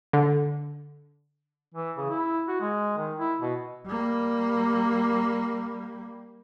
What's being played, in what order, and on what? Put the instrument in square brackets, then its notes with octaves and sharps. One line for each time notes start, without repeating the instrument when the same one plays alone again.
[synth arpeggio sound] D3
[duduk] E3
C#3
E4
F#4
G#3
D#3
E4
B2
[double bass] G3 A#3